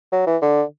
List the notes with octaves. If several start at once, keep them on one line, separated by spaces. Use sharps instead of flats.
F#3
E3
D3